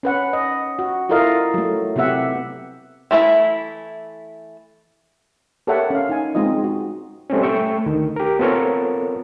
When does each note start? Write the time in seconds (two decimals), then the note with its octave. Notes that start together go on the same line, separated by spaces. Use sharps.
0.03 C#4 B4 F#5
0.33 D#5
0.79 F#4
1.09 E4 F4 A4 A#4 D#5 F5
1.54 F#3 A3
1.96 C3 B3 G4 E5 F#5
3.11 E3 A3 E4 E5
5.67 G4 A4 A#4 C#5 E5 F#5
5.90 C#4 F5
6.09 D#4 G#5
6.35 G#3 C4 D#4 F4 D#5
6.64 F#4
7.30 G3 A3 C4 C#4
7.42 A3 G5 C#6 E6
7.86 D2 D#3
8.16 G4 A#4
8.39 B3 C4 F4 A4 A#4 C#5